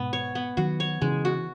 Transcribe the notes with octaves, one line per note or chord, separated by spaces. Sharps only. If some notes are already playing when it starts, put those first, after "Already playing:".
Already playing: G#2 B2 B3
C#5
B3
D#3 F#3 F#4
C#5
C#3 E3 G#3
F#4